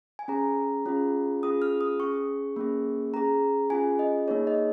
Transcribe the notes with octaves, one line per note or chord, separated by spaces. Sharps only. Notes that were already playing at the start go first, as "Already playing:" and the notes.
G#5
C#4 G#4 A#5
C#4 F4 G#4
C#4 F4 G#4 D#6
F6
D#6
C#4 G#4 C#6
A#3 C#4 G#4
C#4 G#4 A#5
C#4 F4 G#4 G#5
D#5
A#3 D#4 G#4 C#5
D#5